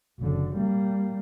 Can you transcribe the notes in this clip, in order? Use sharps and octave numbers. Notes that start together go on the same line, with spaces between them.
F#1 D3
G3 A#3